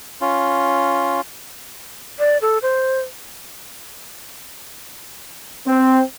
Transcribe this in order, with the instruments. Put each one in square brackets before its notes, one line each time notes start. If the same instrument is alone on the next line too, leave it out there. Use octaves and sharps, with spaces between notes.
[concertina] C#4 F4
[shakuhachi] D5
A4
C5
[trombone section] C4